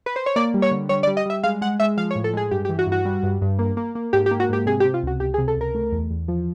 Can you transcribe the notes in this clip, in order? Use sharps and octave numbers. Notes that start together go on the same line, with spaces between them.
B4
C5
C#5
A#3 D5
G3
C#5
D3
G3 C#5
D5
G3
D#5
G3 E5
G#3 F5
G#3 F#5
G#3 E5
F3 F5
C#5
A2
A4
G#3 G#4
G2 G4
G4
E3
F#4
G2
F#4
G3
G2
G2
A#3
A#3
A#3
G#2 G4
G4
A#3
F#4
G#2 G4
C3 G#4
G4
C3
F4
C#2 F#4
C#2 G4
G#4
C3
A4
C#2 A#4
A3
E2
E2
F3